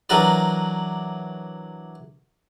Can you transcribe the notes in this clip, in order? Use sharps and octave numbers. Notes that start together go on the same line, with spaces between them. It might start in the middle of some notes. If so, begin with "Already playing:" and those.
E3 F#3 D4 A#4 B4 D5